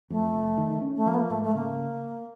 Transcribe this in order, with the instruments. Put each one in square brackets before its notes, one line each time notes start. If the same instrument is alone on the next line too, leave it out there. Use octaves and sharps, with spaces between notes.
[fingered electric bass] F2 [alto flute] A3
[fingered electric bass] F1
D#3
C#4
[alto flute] A3
[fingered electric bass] F3 [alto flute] A#3
[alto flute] B3
A#3
[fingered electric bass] G#2 [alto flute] A3
[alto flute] A3
[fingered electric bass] C#3 [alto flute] A#3